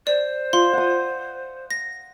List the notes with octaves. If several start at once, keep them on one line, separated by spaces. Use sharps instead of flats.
C5 D5
F4 C6
F#5 D#6
A#6